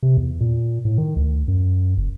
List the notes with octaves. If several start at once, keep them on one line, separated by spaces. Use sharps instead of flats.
C3
E2
A#2
A2
D#3
D2
F#2
F#1